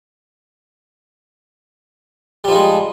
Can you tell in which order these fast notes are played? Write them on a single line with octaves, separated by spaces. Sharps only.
G3 F3 D#4 G#3